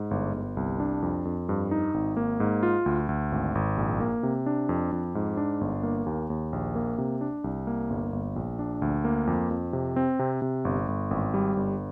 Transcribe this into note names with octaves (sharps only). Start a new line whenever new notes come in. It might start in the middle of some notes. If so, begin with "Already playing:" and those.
Already playing: G#2
G1
G1
C2
D4
F2
F2
G2
D#4
G#1
A#3
G#2
F4
D2
D2
G#1
G#1
A#1
A#3
C3
D4
F2
F2
G#2
D4
G1
A#3
D#2
D#2
A#1
A#3
C3
D4
C2
A#3
G1
G1
A#1
D4
D2
A#3
F2
F2
C3
C4
C3
C3
G1
G1
G#1
G3
G1